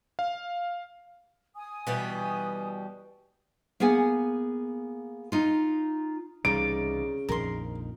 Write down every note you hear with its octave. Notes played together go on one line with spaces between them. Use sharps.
F5
G#5 D#6
B2 E3 G3 B4
A#3 B3 G#4 F#5 G#5
D#4 F4
C2 C#3 E3 G3 D#4 F4 D5 D7
A#1 F2 D#3 A#4 C6